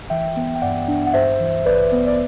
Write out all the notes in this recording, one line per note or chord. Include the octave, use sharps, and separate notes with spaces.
E3 E5 G5
B3
G5
G2 D5 F#5
D4
F#5
G2 C5 E5
E3
A1 B4 D5
B3
D5